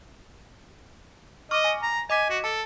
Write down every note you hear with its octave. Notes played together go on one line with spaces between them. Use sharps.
D#5 C#6 D6 F6
G#5 A#6
A#5
D#5 G#5 D6 B6
F#4
A4 A5